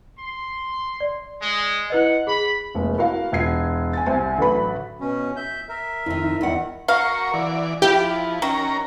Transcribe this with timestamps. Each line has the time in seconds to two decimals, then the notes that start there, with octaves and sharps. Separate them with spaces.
0.18 C6
1.00 D5
1.40 G#3
1.90 E4 B4 D#5 F#5
2.27 G#4 B5
2.75 F1 G#3 A#3
2.97 E4 F#4 A#4 F5
3.32 E1 F4 G#6 C7
3.93 G#5 A6
4.06 C2 G3 C5 G#5
4.38 A1 D3 F#3 B4 B5
5.00 B2 C#4
5.36 E5 G6
5.69 A#4 E5
6.06 F2 D#3 E4
6.41 E2 D#3 F#5
6.88 F#4 A#4 F5 C#6
7.34 E3 D5
7.82 F3 E4 G4
8.42 D#3 C#4 A#4 A#5